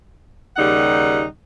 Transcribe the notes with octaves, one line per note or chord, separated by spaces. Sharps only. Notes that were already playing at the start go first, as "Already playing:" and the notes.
D#2 C#3 G3 D#4 F#5